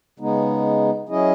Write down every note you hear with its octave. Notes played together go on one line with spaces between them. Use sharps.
C#3 G#3 B3 D#4
F#3 C#4 E4 G#4 D#5